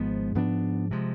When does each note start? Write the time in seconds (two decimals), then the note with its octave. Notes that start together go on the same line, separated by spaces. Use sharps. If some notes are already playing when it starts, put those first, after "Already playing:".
Already playing: G#1 G#2 F3 B3
0.35 G#2 F3 B3 D4
0.91 C3 F3 G#3